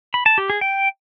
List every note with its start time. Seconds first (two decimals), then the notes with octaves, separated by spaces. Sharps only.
0.14 B5
0.26 A5
0.38 G4
0.50 G#4
0.61 G5